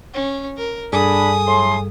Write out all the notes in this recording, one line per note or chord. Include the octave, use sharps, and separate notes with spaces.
C#4
A#4
G2 D4 G#4 A4 G#5 B5 D#6
A2 F#3 C6